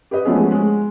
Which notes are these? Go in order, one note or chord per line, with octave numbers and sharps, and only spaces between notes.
G4 B4 D#5
F3 G#3 A3 B3 C#4 G#4
G#3